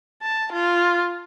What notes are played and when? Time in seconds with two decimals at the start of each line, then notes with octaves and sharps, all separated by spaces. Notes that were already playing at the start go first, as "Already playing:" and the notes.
0.22 A5
0.52 F4